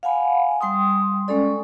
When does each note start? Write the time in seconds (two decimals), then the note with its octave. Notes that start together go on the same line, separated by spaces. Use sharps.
0.03 F5 F#5 G#5 B5
0.61 G3 G5 C6 D#6
1.28 G#3 C#4 A4 D5